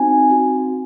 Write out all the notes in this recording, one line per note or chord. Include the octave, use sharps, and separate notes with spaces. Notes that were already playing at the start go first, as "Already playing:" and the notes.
Already playing: C4 D#4 F#4 G#5
C4 F#4